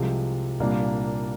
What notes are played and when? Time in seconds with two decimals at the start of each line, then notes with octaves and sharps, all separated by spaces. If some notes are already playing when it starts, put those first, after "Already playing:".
Already playing: C2 C3 F3 G#3
0.60 C2 A#2 G3 A#3 D4